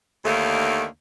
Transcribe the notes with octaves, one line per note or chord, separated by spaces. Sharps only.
D#2 D3 D#3 A3 A#3